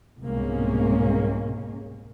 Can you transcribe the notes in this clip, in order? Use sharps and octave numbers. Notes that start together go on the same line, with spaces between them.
C2 G#2 B2 G#3 A#3 C#4